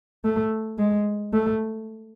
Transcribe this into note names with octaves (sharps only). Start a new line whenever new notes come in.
A3
G#3
A3